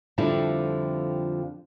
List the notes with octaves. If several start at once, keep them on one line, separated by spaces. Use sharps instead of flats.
F2 D3 F3 G3 E4